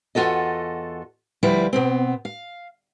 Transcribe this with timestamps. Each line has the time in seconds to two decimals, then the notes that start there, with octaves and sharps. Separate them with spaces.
0.15 E2 F4 F#4 A4 D#5
1.43 D2 F3 G3 E4 B4 F5
1.73 B2 B3 C4
2.25 F5